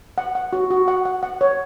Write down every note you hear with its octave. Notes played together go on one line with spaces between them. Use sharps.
F#5
F#5
F#4
F#4
F#5
F#5
F#5
C#5